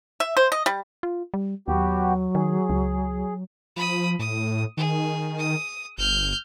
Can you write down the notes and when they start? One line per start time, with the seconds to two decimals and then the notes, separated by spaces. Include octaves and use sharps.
0.20 E5
0.37 C5
0.52 D#5
0.66 G3
1.03 F4
1.34 G3
1.68 D#2 F#3 B3 F#4 G4
2.35 D#3 G#4
2.69 C#2
3.76 F3 B5 D#6
4.19 A2 D#6
4.77 D#3 G#4
5.39 D#6
5.98 G1 F6 G6